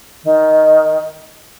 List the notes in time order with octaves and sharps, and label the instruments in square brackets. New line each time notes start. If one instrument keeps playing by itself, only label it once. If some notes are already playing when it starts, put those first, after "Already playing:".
[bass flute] D#3